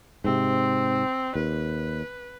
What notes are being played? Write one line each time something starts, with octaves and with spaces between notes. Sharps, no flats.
G#2 C3 C4
D#2 B4